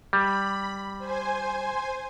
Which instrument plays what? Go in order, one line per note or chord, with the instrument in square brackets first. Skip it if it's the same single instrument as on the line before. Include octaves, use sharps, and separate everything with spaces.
[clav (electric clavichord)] G3 [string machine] B5
[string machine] C5 G#5